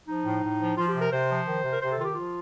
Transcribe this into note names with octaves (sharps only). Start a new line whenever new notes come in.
F3 D#4
A2
A2
F3
F3 F4
G4
C3
A#4
C3 C5
F3
D#3
C3
A#4
C3 C5
A4
D#3 F4
G4
F3 F4